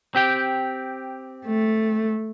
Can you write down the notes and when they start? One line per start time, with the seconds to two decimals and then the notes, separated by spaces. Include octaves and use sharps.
0.15 C4 G4 G5
1.46 A3